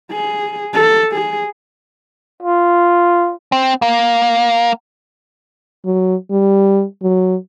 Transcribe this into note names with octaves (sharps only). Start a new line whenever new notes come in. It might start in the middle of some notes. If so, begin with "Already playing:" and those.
G#4
A4
G#4
F4
C4
A#3
F#3
G3
F#3